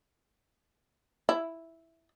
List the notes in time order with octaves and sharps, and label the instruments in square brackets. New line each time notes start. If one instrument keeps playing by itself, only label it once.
[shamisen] E4